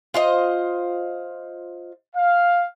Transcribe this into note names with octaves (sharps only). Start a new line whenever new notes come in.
F4 C5 D#5
F5